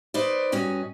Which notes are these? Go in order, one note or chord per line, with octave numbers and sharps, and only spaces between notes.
D#4 B4 C5 D5
G2 C#4 F#4 C#5 D#5